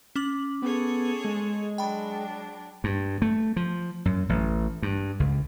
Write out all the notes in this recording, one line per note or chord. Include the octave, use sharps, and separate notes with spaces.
C#4 D6 F#7
B3 G#4 A4 C#5
G#3
F#3 D4 G5 B5
G2
A3
F3
F#2
A1
G2
C#2